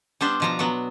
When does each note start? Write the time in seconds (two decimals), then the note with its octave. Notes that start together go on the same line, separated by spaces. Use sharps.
0.21 G3 B3 D4 G4 C5
0.40 B2 F3 A#5
0.59 F#3 B3